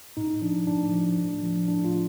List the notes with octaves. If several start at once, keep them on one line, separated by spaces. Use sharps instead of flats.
A2 D#4
F3 D4
A2 D4
F3
A2
F3
A2 D4
F4